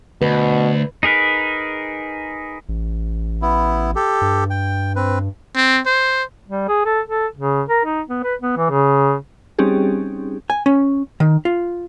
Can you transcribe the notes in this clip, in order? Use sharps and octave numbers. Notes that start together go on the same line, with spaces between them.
D2 B2 B4
D#4 G#4 A#4 B4
A1
B3 E4
G4 A4
G2
G5
C4 B4
C4
C5
G3
G#4
A4
A4
C#3
A#4
D#4
B3
B4
B3
E3
C#3
G3 C4 C#4 D#4 G4 G#4
G#5
C#4
D#3
F4